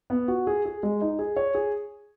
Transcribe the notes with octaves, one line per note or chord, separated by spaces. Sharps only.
B3
F#4
G#4
G#4
G#3
D#4
G#4
C#5
G#4